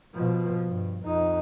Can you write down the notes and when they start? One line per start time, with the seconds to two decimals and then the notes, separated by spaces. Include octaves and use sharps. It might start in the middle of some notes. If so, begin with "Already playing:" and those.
0.15 B2 F3
0.67 G2
1.05 F2 D#4